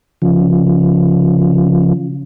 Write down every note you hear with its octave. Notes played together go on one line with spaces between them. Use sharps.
C#3 F3